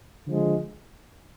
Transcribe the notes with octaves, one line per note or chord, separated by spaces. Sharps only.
D3 F3 G#3